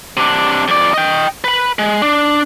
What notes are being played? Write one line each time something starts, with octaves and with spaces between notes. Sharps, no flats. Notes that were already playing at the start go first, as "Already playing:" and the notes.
C3 D4
F2 D5
D#5 G5
B4 B5
G#3
D4